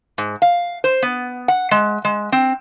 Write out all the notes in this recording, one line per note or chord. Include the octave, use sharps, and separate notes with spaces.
G#2
F5
C5
B3
F#5
G#3
G#3
C4